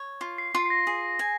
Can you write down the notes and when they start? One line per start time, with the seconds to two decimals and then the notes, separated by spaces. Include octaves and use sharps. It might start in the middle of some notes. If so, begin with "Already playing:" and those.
Already playing: C#5
0.21 F4
0.38 C7
0.54 F4
0.66 C7
0.70 A#6
0.87 G#4
1.19 G#5